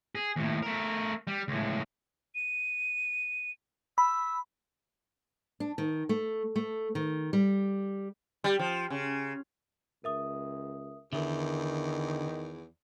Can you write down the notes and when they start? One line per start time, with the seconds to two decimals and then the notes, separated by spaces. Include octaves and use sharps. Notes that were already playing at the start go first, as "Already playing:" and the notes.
0.15 G#4
0.36 D#2 A2
0.62 A3 A#4
1.27 G3
1.48 C#2 A2
2.35 D#7
3.98 B5 E6
5.60 D4
5.78 D#3
6.09 A3
6.56 A3
6.95 D#3
7.33 G3
8.44 G3
8.59 F3
8.90 C#3
10.04 C#2 A#4 E5 D#6
11.13 E2 D3 D#3 A#4 E5